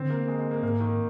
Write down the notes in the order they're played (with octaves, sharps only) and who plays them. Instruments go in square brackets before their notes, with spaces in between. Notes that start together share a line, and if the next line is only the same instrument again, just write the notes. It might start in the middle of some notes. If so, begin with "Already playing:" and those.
Already playing: [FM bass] D3 [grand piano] C4
[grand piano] A#3
G#3
G#3
A#3
[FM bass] G#2 [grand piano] A#3
[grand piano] D#3